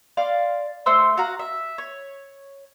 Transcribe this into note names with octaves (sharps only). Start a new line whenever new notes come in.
D5 F5 C6
A3 C5 C6 E6
F#4 F5 F#5 A#5
E5
C#5